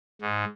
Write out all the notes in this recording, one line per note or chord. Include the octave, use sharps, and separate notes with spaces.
G#2